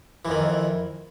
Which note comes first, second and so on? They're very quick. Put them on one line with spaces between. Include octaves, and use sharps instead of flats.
E3 F2 D#3